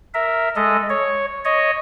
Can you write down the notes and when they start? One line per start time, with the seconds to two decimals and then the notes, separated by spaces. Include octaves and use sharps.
0.14 A#4 E5
0.56 G#3 A4 D#5
0.90 C#5
1.45 C#5 D#5